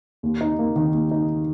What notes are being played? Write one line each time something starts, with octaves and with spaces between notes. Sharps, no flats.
D#2
D#4
A#3
D#3
D#2
D#4